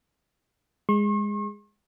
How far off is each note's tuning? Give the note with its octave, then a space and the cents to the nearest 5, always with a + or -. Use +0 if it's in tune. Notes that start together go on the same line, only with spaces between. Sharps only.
G#3 -10 C#6 -45